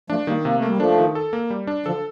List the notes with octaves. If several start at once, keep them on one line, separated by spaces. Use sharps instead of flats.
F3 A3 D4
D#3 G3 A#3
C3 A#3
A3
G3 A#3
F3 A3 D4
D#3
A4
A#3
G3
D4
D3 F3 A4